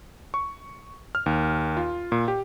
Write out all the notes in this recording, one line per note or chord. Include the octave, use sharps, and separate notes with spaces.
C#6
F6
D#2
F4
A#2
G4